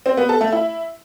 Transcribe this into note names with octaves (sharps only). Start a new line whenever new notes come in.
C4
B3
A4
A3
E4